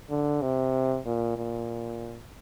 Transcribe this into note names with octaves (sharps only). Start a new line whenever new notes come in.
D3
C3
A#2
A#2